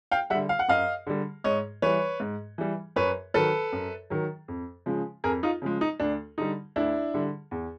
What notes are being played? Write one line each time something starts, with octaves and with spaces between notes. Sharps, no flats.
F5 G5
D3 G3 E5 F#5
F5
F#5
F#2 D#5 F5
D3 G3
G#2 C#5 D#5
E3 G3 B4 C#5
G#2
E3 G3
F#2 B4 C#5
D#3 F#3 A4 B4
F#2
D#3 F#3
F2
C#3 F3 G#3
F2 G#4 A#4
D#4 F4
C#3 F3 G#3
D#4
D2 D4
D3 G3 D#4
D2 D4 E4
D3 G3
E2